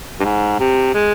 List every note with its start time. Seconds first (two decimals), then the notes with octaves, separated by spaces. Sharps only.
0.20 G2
0.25 G#2
0.60 C3
0.94 G#3